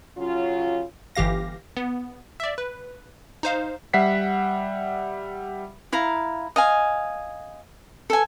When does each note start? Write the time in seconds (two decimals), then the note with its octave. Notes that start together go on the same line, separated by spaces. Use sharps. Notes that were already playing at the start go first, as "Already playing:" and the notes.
0.17 C#3 F#3 C#4 F4
1.15 G1 E3 G4 F5 A#6
1.77 B3
2.40 D5 E5
2.58 B4
3.43 D#4 C5 F5
3.93 G3 E5 F#5 B6 C7
5.93 E4 F5 A#5
6.56 D#5 F5 G#5
8.10 A4 G#5